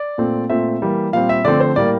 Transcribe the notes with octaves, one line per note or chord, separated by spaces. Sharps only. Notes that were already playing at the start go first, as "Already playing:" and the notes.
Already playing: D5
A#2 A3 C4
A#2 A3 C4 E5
E3 G3 A#3
A#2 G3 C4 F5
E5
D3 F3 A3 C4 D5
C5
A2 G3 A#3 D5